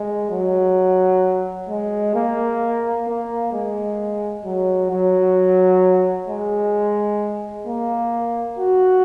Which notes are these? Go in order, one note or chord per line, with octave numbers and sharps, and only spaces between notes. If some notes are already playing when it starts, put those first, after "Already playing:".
Already playing: G#3
F#3
G#3
A#3
A#3
G#3
F#3
F#3
G#3
A#3
F#4